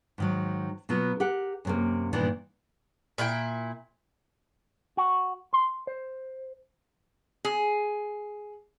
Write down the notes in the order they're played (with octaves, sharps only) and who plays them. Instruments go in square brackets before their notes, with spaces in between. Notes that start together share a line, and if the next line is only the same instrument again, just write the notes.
[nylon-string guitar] G#2 D#3 F#3
B2 F#3 B3 F4
G4 A#4 F#5
F#2 C3 A#3
G2 A#2 D#3 E3 B3 D4
[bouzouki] A#2 E4 F#4 G5
[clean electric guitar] F#4
C6
C5
[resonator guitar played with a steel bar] G#4